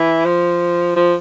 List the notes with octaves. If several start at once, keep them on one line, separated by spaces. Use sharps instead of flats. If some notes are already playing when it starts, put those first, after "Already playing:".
Already playing: E3
F3
F3